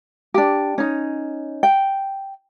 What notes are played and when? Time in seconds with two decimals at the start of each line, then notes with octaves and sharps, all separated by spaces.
0.34 D4 G4
0.78 C#4 D#4
1.63 G5